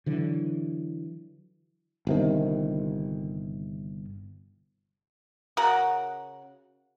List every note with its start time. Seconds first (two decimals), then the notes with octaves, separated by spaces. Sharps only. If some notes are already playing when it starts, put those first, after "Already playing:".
0.06 D3 E3 F#3
2.07 G1 C3 D#3
5.57 C#3 F#4 A#4 F#5